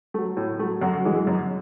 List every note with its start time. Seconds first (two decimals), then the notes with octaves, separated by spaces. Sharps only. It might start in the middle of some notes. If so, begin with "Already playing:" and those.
0.14 F#3 A3
0.37 A2
0.59 F#3 A3
0.81 F#2 F#4
1.05 E3 G#3
1.27 F#2